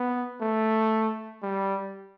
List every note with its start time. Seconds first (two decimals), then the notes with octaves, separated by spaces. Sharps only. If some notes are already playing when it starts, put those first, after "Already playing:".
Already playing: B3
0.41 A3
1.42 G3